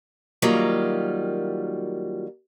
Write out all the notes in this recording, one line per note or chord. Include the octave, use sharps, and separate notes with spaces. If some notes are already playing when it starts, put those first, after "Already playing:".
D#3 F#3 G3 A#3 F4